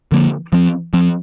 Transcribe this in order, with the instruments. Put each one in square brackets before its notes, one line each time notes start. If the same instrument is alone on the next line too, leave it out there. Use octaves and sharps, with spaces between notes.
[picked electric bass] D3 F3 A#3
F3 C4
F3 C4